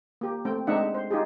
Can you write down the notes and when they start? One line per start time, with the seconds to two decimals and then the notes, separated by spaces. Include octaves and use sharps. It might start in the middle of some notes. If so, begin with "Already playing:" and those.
0.21 A#3 G4
0.45 A3 C4 G5
0.67 G#3 C4 D4 D#4 E5 F#5
0.95 C5
1.11 D#4 F4 G4 G#4